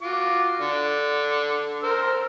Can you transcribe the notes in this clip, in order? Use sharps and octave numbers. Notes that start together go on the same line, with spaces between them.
F4 F#4 D6
D3
A#4 C5 E6